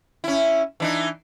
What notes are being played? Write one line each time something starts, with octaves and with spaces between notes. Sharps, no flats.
C#4 E4
E3 D4 D#4